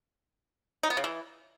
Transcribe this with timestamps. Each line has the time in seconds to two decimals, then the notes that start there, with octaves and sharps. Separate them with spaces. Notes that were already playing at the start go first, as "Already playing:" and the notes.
0.83 D#4
0.90 B3
0.97 C#3
1.04 E3